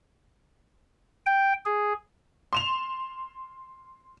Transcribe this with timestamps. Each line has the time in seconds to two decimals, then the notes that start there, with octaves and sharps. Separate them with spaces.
1.26 G5
1.66 G#4
2.53 C6 E7 F7